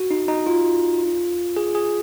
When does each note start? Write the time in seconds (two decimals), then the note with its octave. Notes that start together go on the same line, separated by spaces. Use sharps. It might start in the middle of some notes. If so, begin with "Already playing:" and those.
Already playing: F#4
0.11 D#4
0.28 D#4
0.47 F4
1.57 G#4
1.75 G#4